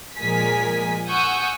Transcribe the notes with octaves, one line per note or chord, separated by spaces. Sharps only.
A#2 F3 G#3 A#4 G#5 B6
F#5 G#5 C#6 D#6 E6 G6